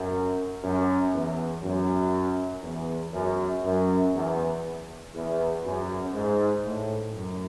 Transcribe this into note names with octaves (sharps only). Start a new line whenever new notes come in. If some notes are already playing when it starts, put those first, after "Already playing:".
Already playing: F#2
F#2
E2
F#2
E2
F#2
F#2
E2
E2
F#2
G#2
A2
F#2